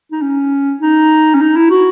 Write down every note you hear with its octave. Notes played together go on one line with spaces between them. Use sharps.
D#4
C#4
D#4
C#4
D#4
E4
F#4